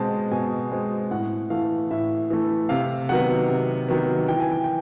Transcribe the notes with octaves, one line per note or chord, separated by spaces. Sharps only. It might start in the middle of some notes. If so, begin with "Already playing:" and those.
Already playing: B2 G#3 C4 A5
B2 G#5
G#3 C4
A2 F#5
E3 A3 F5
A2 E5
E3 A3
C3 F5
D#3 F#3 B3 F#5
C3
D#3 F#3 B3
E3 G5
G#5
G5
G5